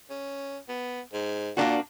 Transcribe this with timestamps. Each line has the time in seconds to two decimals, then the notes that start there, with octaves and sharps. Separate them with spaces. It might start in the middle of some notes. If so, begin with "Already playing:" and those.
0.10 C#4
0.69 B3
1.13 G#2
1.57 A#2 A#3 D4 F#4